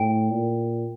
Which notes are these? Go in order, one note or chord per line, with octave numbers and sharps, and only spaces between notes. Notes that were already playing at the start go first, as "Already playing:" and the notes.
Already playing: A2 G5
A#2